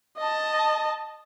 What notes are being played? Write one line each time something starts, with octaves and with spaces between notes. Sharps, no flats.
D#5 A5